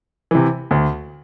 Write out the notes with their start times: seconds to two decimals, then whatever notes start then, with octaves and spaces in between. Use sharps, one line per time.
0.31 C3 E3
0.71 D2